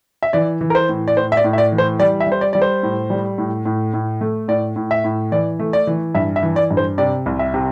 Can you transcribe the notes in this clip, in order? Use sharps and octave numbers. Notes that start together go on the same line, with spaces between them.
E5
E3 D5
E3
A#4
C5
A2
D5
A2 C5
E5
D5
A2
E5
D5
E3
C5
G3 D5
E5
G3 C5
D5
G3 D5
C5
A2
G3
A2
A2
A2
A3
A2 D5
A2
E5
A2
E3 D5
A3
D5
E3
G2 E5
E5
E3
D5
G2
C5
C3 D5
C2
E5
C3